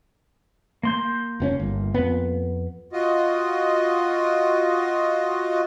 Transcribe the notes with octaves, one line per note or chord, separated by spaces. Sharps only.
A#3 C6 G6
F1 A2 C#4
G1
F2 B3
F4 F#4 D#5